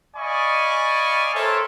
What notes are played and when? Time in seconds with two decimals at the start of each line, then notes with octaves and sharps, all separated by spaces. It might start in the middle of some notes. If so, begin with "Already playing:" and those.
0.16 D5 D#5 F5 G#5 B5 C#6
1.34 A4 A#4 C5 C#5 E5